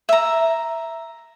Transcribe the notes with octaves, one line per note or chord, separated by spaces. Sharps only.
E5 A#5